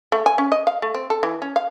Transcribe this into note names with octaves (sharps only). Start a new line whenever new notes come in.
A3
G#5
C#4
D#5
F5
A3
C4
A4
E3
C#4
F5